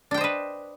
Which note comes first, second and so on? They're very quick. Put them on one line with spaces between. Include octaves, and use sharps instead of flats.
D4 G5 C5 D#5 B4